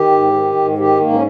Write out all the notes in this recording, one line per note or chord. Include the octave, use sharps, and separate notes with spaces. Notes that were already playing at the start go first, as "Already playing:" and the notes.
Already playing: D#3 G4
G#2
D#3
G#2
D#3 G4
G#2 A#3
C#4